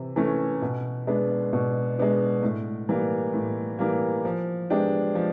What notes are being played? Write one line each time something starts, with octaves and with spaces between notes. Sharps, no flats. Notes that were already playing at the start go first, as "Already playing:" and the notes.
Already playing: C3 E3
E3 A3 C#4
B2
G#3 B3 D4
B2
G#3 B3 D4
A2
E3 G3 A#3
A2
E3 G3 A#3
F3
G#3 B3 D4 G4
F3